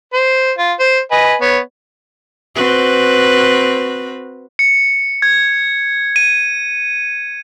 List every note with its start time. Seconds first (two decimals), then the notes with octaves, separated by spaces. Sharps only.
0.13 C5
0.58 F4
0.80 C5
1.11 B4 D#5 G#5
1.41 B3 C#5
2.55 C4 F#4 B4
4.59 C#7
5.22 G#6
6.16 D#7